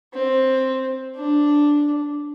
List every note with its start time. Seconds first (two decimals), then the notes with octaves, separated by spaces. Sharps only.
0.13 C4
1.16 D4